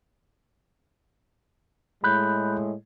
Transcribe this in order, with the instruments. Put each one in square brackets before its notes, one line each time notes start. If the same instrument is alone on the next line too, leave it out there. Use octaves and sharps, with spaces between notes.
[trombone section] A2 G#3 [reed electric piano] B5 F#6 G6